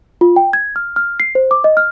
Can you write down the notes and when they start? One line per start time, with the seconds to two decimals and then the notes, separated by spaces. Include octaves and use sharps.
0.21 F4
0.36 G5
0.53 G#6
0.76 F6
0.96 F6
1.20 C7
1.35 C5
1.51 D6
1.64 D#5
1.77 F6